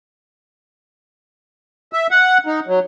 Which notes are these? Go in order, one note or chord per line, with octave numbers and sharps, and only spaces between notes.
E5
F#5
D#4
F#3